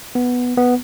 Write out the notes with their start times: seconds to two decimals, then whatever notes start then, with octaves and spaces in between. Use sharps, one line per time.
0.15 B3
0.57 B3